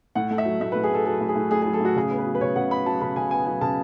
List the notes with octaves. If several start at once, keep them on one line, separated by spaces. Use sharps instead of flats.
A2 F#5
A3
E5
F#3
A2 E5
A2 B4
G#4
A3 A4
F#3 A4
A2
G#4
A2
A3 G#4
F#3 G#4
A4
A2 F#4
C#3 G#4
B3
B4
F#3
B4
C#3 C#5
C#3 F#5
B3 B5
F#3 A5
C#3 B5
C#3 G#5
B3 G#5
F#3 G#5
C#3 A5